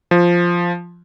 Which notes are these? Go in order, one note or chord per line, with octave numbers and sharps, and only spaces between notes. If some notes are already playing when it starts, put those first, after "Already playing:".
F3